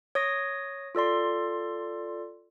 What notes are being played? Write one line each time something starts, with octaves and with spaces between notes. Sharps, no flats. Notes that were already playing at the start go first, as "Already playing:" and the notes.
C#5 D#6 A#6
F4 A4 D5 C6